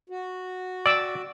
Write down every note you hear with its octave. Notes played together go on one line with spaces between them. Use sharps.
F#4
D5 D6 E6